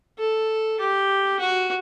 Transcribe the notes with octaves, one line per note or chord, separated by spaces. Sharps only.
A4
G4
F#4